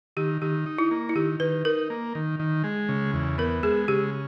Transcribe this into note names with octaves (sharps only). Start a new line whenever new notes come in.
D#3 G4
D#3 G4
D#4
E4
A#3
E4
D#3 G4
D#3 B4
D#4 A#4
A#3
D#3
D#3
G#3
C#3
E2
B3 A#4
G#3 G#4
C#3 G4